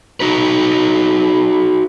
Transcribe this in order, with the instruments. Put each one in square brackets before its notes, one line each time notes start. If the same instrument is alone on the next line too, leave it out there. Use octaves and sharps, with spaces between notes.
[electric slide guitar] D#4 F#4 B4